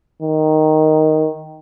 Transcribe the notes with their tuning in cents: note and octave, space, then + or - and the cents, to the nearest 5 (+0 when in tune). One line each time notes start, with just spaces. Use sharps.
D#3 +0